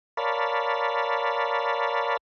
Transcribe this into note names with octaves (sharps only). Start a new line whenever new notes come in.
A#4 C#5 D5 F5 A5 B5